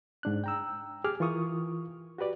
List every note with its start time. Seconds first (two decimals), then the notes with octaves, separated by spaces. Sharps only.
0.23 G#2 D4 F#6
0.44 G5 A#5 E6
1.04 G4 G#4 D6 F6
1.20 E3 F4 A#4 C#6 D#6
2.18 F#4 G4 B4 D5